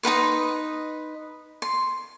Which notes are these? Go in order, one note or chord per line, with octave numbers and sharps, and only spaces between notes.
D#4 F4 B4 C6
C6